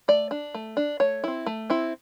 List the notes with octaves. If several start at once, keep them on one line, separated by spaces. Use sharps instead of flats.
A3 D5
D4
A3
D4
A3 C#5
C4 E4
A3
C4 E4